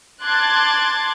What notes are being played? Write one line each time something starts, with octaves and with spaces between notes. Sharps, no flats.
A5 C6 D6 F#6 G#6 A6